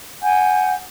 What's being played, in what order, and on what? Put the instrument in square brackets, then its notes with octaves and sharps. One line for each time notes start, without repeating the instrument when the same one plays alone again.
[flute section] F#5 G#5 G6